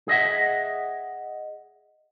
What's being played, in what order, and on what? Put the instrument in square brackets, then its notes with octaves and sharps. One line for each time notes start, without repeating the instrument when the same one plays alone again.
[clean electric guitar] G#4 D#5 E5 F#5